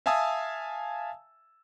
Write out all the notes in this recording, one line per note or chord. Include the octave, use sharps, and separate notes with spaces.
E5 F5 G#5 A5 D#6 E6